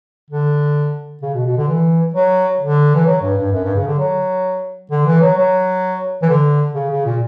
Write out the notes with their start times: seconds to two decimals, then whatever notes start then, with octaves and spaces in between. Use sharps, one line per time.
0.30 D3
1.22 C#3
1.34 B2
1.46 B2
1.57 D3
1.68 E3
2.14 F#3
2.60 D3
2.95 E3
3.06 F#3
3.22 G2
3.37 G2
3.52 F#2
3.64 G2
3.75 C#3
3.87 D3
3.98 F#3
4.91 D3
5.06 E3
5.21 F#3
5.37 F#3
6.22 E3
6.29 D3
6.74 C#3
6.90 C#3
7.05 A#2